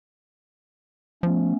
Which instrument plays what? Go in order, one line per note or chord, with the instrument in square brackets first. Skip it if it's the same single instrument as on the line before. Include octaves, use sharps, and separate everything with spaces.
[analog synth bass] F3 [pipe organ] A3 B3 C#4